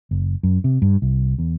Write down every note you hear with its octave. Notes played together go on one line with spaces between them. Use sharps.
F#1
F#2
C3
G2
C2
E2